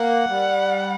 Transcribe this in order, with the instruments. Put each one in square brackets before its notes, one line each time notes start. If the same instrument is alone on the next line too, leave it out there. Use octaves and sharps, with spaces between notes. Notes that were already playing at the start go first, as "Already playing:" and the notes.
Already playing: [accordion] A#3 [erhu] F#5
[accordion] G3